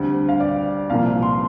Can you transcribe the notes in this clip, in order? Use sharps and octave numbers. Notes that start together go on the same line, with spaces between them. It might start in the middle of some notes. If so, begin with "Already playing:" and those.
Already playing: D2 D3 G3 C4
F5
D5
C2 A#2 F3 A#3 F5
C6